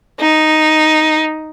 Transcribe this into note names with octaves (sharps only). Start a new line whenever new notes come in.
D#4